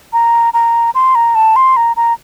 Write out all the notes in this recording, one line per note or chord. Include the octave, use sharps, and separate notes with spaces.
A#5
A#5
C6
A#5
A5
C6
A#5
A#5